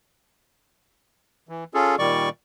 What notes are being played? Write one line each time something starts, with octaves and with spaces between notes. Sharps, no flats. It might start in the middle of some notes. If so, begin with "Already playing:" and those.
E3
C#4 F4 G#4 A4
A#2 D#3 G3 D5 C#6